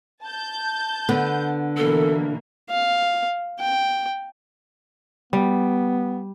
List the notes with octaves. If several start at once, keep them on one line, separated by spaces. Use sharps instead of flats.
A5 G6
D3 B3
B2 E3 A#3 A4
F5
G5
G3 B3